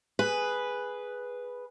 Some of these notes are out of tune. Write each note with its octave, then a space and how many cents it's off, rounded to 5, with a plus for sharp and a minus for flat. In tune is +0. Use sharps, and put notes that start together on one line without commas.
G#4 +0 B4 +0